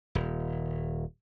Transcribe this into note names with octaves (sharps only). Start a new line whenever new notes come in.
D#1